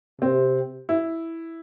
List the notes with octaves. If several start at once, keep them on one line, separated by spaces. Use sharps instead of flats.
C3 C4
E4